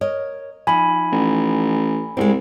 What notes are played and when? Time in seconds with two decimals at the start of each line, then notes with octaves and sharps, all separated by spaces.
0.01 A#4 C#5 D#5
0.67 F3 D#4 G#5 B5
1.12 A1
2.17 C2 G#3 C4